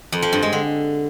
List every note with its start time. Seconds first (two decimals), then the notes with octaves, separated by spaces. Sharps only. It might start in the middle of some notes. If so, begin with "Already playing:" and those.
0.12 F2
0.22 F3
0.32 G2
0.43 G#3
0.53 D3